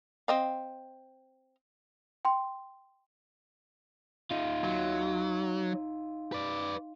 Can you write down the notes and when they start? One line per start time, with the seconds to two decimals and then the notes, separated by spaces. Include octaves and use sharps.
0.28 C4 D#5 F5
2.25 G5 C6
4.31 D#4 F4
4.64 F#3
6.32 B4 D5